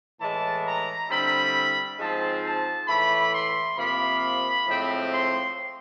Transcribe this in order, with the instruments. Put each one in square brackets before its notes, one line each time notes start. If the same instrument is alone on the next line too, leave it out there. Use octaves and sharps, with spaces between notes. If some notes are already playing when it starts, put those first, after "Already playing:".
[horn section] A2 E3 G#3 A5
A#5
D3 G3 C4 E4 B5
G#2 F3 G#3 C4 A5
A5
A2 E3 A3 B5
C6
C3 F3 A#3 B5
A2 F3 G#3 C4
C6